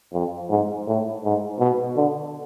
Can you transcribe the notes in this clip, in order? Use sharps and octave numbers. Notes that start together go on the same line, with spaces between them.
F2
G#2
A2
G#2
B2
D3